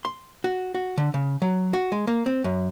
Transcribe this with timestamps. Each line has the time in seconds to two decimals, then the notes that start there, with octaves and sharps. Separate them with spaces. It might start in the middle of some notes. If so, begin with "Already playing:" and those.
0.05 C6
0.44 F#4
0.75 F#4
0.98 D3
1.14 C#3
1.42 F#3
1.73 F#4
1.92 G#3
2.07 A#3
2.26 C4
2.44 F#2